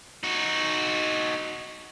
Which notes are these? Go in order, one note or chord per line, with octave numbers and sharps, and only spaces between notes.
D#4 F#4